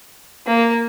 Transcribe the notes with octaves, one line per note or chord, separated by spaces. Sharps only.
A#3